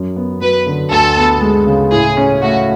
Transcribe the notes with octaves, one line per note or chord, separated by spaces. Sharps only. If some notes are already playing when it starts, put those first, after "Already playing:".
Already playing: F#2
B3
F#3 B4
D3
D2 A4
B3
G#3
C#3
A2 G#4
C#4
A3 F#4